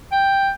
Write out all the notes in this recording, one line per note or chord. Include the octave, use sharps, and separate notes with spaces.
G5